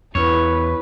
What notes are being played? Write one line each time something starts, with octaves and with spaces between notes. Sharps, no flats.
E2 E4 B4 C#5